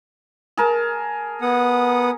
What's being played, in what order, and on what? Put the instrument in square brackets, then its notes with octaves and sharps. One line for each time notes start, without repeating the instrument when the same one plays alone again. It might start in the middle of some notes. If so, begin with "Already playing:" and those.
[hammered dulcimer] G#4 A#4 A5
[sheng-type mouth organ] B3 F#5 D#6